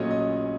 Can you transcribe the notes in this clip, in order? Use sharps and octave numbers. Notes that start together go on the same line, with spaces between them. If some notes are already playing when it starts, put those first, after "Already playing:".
Already playing: A#1 A#2 F#3 A3 C#4 C#5 D#5
D#5